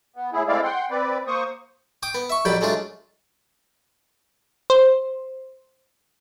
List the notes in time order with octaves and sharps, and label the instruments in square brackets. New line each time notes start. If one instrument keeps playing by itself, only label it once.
[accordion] B3
A2 E4 G#4
G#3 A3 C4 E4 D5 F5
F#5 G5 C6
C4 B4 D5
A#3 C5 C#6 D#6
[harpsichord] G5 D6 D#6
B3
E5 C#6
A#1 F2 F#3 G3 G5 B5
F#3 G#3 A3 D4 F4
[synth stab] C5